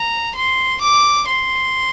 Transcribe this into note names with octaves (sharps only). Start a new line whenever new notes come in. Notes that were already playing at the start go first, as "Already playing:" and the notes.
Already playing: A#5
C6
D6
C6